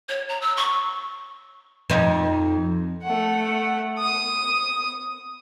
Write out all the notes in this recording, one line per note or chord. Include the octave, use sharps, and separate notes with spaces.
C#5
A#5
E6
C#6
F2 D#4
A3 F#5
D#6